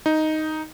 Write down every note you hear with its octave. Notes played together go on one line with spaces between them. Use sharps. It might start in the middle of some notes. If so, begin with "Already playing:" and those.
D#4